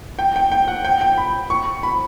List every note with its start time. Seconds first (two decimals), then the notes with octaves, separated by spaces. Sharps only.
0.19 G5
0.36 G5
0.52 G5
0.68 F#5
0.85 G5
1.01 G5
1.18 B5
1.50 C#6
1.83 B5